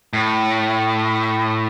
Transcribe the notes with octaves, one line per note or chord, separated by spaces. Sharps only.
A2